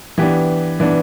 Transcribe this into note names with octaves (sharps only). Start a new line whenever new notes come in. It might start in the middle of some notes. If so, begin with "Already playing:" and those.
E3 B3 D4 G4
E3 B3 D4